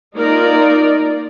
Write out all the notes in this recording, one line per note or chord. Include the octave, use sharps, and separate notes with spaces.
A#3 D#4 F4 A#4 D5